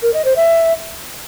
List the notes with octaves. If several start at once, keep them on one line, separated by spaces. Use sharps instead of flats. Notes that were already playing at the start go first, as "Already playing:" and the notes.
A#4
D#5
C5
E5